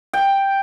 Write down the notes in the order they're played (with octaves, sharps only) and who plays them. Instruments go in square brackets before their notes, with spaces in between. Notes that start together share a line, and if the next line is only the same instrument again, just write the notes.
[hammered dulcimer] G5